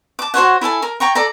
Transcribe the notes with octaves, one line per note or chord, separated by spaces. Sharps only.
A5 D6
F#4 C5 C#5 F#5
E4 A4 G#5 A5
A#4
C#5 G5 A#5 C#6
A4 D5 A#5